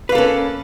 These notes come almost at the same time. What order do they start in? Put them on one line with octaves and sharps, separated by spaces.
B4 A#3 A4 C#4